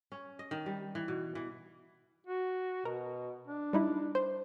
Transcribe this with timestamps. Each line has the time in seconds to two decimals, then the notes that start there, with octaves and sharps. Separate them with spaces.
0.12 C#4
0.39 D#5
0.51 D#3
0.66 G3
0.95 E3
1.08 B2
1.35 E3
2.27 F#4
2.85 B2 A#4
3.47 D4
3.73 G3 D#4 E4
4.15 C5